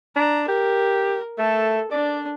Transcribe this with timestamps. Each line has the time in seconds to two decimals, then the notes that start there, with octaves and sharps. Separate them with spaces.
0.16 D4 A#5
0.48 G4 A#4
1.38 A3 A4
1.91 D4 D5